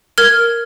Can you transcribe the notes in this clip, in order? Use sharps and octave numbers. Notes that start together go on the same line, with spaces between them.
A#4 F6 G#6